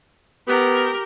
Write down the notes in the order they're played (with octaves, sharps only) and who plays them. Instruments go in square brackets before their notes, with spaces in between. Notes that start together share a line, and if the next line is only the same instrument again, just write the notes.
[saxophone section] B3 [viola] G4 A#4